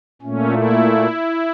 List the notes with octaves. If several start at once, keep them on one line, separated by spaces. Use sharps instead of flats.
A#2 A3 C#4
E4